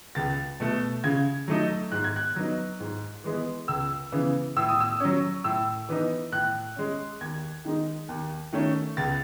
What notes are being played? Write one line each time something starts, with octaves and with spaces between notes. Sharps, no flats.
C#2 A6
B2 A3
C#3 G#6
F#3 A3 D#4
G#2 F#6
G#6
F#6
F#3 B3 D#4
G#2
E3 G#3 B3
C#2 E6
C#3 E3 B3
A2 E6
D#6
E6
F#3 C#4
A2 E6
E3 B3 D#4
A2 F#6
G#3 C#4
D#2 G#6
D#3 G#3 D#4
D#2
D#3 A3 C#4
C#2 A6